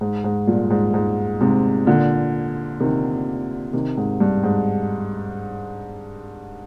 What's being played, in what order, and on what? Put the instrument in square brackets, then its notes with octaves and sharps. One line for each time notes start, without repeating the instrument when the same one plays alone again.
[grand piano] G#2
G#2
G2 A#2
G#2
G#2
G#2 C3
A#2 D3
C3 D#3
C3 D#3
G#2
G2
G#2